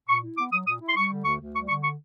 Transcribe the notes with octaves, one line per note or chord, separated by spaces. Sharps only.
A#2 C#6
E4
B3 D6
F#3 D#6
A#2 D#6
E4
C6
G3 C#6
D3
D2 C#6
D2
G3 C#6
D3 C#6
C#6